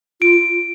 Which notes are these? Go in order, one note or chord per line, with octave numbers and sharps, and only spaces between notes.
F4 D7